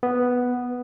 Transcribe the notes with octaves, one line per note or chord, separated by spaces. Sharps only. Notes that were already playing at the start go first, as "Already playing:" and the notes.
B3